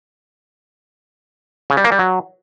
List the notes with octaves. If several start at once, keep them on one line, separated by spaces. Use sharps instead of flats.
C#3
G3
A#3
G3
F#3